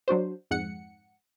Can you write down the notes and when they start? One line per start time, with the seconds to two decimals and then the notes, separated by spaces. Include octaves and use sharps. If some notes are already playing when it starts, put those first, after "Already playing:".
0.08 F#3 D4 F#4 C5
0.51 F2 G#2 F#5 C#7